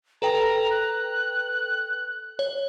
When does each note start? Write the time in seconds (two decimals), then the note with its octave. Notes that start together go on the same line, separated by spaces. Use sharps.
0.22 A4 B4 G5 A#5
0.71 F#6
2.39 C#5